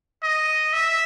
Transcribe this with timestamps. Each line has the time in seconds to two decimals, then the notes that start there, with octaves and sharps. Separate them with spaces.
0.23 D#5
0.73 E5